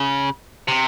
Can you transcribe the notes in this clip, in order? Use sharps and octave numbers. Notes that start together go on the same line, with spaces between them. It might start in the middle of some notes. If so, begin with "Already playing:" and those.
Already playing: C#3
C3